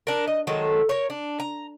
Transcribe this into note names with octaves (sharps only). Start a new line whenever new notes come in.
D4 A#4
D#5
D#3 F#3 G#3 A4
A#4 C#5
D4
A#5